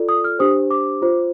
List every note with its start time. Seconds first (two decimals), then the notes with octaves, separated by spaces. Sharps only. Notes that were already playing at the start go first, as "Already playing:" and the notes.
Already playing: F4 A4 D5
0.09 D#6
0.24 F6
0.39 D4 G4 C5 D#6
0.71 D6
1.02 F4 C5